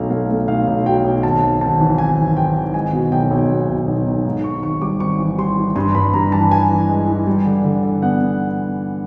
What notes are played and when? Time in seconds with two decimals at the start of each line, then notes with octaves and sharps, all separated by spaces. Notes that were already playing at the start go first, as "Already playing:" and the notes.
Already playing: B1 A3 F5
0.10 A3 F5
0.30 A3
0.48 B1 F5
0.67 B1
0.86 F#3 G5
1.04 B1
1.23 G#1 A5
1.43 G#1
1.61 G#1 A5
1.80 E3
1.98 G#1 G#5
2.18 E3
2.37 G#1 G5
2.55 G#1
2.74 G#3 G#5
2.93 B2
3.12 B1 G5
3.31 B1
3.50 B2
3.69 B1
3.87 B1
4.06 B1
4.25 G#2
4.44 G#2 C#6
4.62 G#1 C#6
4.82 G3 D6
5.00 G#1 C#6
5.19 E3
5.38 G3 C6
5.57 E3
5.76 G2 C6
5.95 G2 B5
6.14 G2 A#5
6.32 E3 A5
6.51 E3 G#5
6.71 E3
6.89 G#3
7.08 E3
7.27 G3
7.45 D3
7.64 D3
7.83 D3
8.02 B3 F#5
8.21 B3